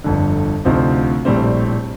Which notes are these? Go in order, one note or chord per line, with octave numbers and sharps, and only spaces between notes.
G1 F2 D3
D2 C3 F3 C4 D#4
A#1 A2 G3 C4